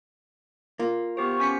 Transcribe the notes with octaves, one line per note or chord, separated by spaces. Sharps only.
A#3 F4
B3 G4 C5 C#6
C#4 B6 C#7